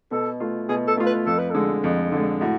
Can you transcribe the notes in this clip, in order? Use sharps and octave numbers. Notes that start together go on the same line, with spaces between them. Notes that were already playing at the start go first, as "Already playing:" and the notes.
B2 A4
A3 F4
B2 G#4
A4
A3 F4
B4
F2 A4
B4
D3 G#3 A4
F2
D3 G#3
A2 F#4